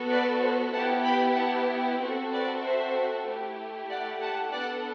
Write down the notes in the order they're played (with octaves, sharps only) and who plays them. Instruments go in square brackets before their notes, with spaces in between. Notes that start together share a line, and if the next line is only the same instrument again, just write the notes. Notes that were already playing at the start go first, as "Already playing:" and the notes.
Already playing: [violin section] B3 F#4 A4
B4 D5
C5
B3 E4 G4 F#5 A5
G5 B5
F#5 A5
C4 F#4 A4
B4 D5
C5 E5
A3 E4 G4
D5 F#5
F#5 A5
B3 D4 A4 D5 F#5